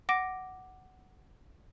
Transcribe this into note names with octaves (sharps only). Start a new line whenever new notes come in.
F#5 D6 A#6 D7